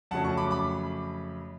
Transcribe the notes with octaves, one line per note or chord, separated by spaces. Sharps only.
F2 C#3 F#3 A3 C#4 F#5 A5
A5 C#6
B5 D6
B5 D6